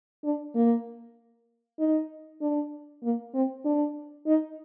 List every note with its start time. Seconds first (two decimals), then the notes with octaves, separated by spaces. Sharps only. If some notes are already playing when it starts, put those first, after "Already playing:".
0.24 D4
0.55 A#3
1.79 D#4
2.41 D4
3.04 A#3
3.35 C4
3.65 D4
4.27 D#4